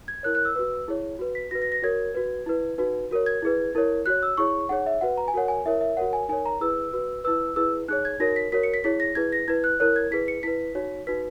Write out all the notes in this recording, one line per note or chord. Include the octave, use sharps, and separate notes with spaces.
G#6
E4 A#4 C#5 F#6
F#6
E6
F#4 B4
E4 G#4 C#5
F#4 B4
B6
F#4 B4 A#6
A#6
A#6
F#4 A#4 C#5 G#6
F#4 B4
E4 B4
D#4 F#4 B4
F#4 A#4 C#5
G#6
E4 G#4 B4
E4 A#4 C#5
F#4 C#5 F#6
E6
E4 G#4 C#5 C#6
D#4 G#4 C#5 F#5
E5
F#4 B4 F#5
A#5
G#5
F#4 A#4 C#5 F#5
G#5
E4 A#4 C#5 E5
E5
F#4 A#4 C#5 F#5
G#5
D#4 A#4 C#5 G#5
A#5
E4 G#4 B4 E6
F#4 B4
E4 B4 E6
E4 G#4 B4 E6
D#4 G#4 C#5 F#6
G#6
D#4 F#4 A#4 C#5 A#6
B6
F#4 A#4 C#5 B6
C#7
B6
E4 G#4 C#5 B6
A#6
E4 G#4 B4 G#6
A#6
E4 B4 G#6
F#6
E4 A#4 C#5 F#6
G#6
E4 G#4 B4 B6
C#7
E4 B4 B6
D#4 F#4 C#5
D#4 F#4 B4 B6